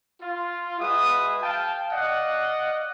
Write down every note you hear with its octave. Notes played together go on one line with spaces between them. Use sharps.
F4
G#3 F#4 G#4 B4 E5 D#6
F5 G5 A5
D5 D#5 F5 F#5